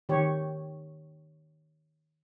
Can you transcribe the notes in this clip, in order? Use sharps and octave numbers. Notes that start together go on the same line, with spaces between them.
D#3 G4 C#5